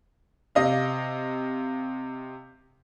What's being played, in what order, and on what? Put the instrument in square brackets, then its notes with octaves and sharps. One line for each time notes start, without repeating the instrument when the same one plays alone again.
[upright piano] C3 D#5 F5